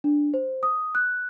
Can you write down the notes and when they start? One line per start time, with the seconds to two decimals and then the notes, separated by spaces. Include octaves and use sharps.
0.04 D4
0.34 C5
0.63 D#6
0.95 F#6